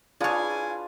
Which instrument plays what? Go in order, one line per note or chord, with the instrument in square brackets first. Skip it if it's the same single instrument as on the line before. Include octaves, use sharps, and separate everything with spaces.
[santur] D4 F4 B4 [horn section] E4 F5 G#5 [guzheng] G#4 C#5